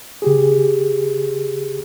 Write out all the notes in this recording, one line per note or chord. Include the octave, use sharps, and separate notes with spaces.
C#3 G4 G#4